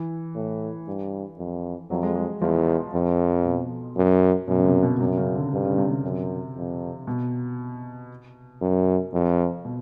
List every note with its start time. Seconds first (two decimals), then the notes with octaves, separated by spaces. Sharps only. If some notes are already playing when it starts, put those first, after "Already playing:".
Already playing: E3
0.35 A2
0.87 G2
1.38 F2
1.90 F2 F#3
2.03 G#3
2.15 G#3
2.41 E2 F3
2.94 F2
3.46 B2
3.96 F#2
4.48 F#2 B2
4.59 C#3
4.66 C3
4.83 B2
4.97 B2
5.00 F#2 C3
5.17 C#3
5.35 D3
5.52 G2 D3
5.65 C#3
5.78 C3
5.91 C3
6.03 F#2
6.55 F2
7.07 B2
8.61 F#2
9.13 F2
9.65 B2